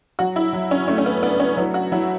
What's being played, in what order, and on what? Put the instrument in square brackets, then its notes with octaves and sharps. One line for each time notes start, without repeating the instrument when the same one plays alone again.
[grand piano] F#3 [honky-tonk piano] F#4
[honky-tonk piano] E4
[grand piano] F#3
[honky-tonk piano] C#4
[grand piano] A3 [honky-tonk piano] C#4
[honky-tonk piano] C#4
B3
[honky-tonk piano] B3 [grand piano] D4
[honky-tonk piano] C#4
[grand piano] F#3 [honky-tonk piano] E4
[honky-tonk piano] F#4
[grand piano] F#3 [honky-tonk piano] E4